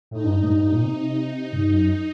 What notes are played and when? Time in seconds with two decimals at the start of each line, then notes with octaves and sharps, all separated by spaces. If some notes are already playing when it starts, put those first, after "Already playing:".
0.11 A2 D#4
0.24 G2
0.43 A2
0.48 G2
0.59 G2
0.72 A#2
0.83 C3 D#4
1.53 G2
1.71 F#2